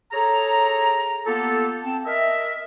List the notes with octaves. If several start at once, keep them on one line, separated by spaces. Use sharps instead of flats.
G#4 A4 C#5 A#5
A#3 B3 F4 G4 A4
C4 A5
A#4 D#5 E5